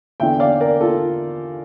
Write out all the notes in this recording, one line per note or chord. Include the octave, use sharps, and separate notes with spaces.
E2 D3 E5 G5
D5 F5
A#4 D5
F4 A4